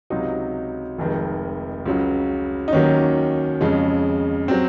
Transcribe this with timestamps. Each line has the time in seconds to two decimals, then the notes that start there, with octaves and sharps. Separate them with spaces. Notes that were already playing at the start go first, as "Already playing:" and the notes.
0.10 C#2 C3 F#3 D#4
0.98 F1 F2 D#3 G#3
1.85 C#2 C#3 F#3
2.68 D#4
2.73 D#2 D#3 F#3 C#4
3.61 F2 C#3 G#3
4.48 F#3 C4